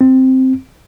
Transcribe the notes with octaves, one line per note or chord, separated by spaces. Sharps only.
C4